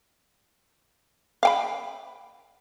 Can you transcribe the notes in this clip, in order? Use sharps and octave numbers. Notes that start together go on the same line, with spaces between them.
F5 G5 B5